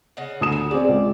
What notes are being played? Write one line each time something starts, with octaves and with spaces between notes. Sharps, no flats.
C#3 D#5 F#5
D2 D#6 E7
F#4
C4 G#4 D5
C#2